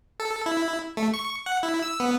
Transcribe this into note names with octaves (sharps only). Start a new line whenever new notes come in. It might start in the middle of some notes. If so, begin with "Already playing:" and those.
A4
E4
A3
C#6
F#5
E4
E6
B3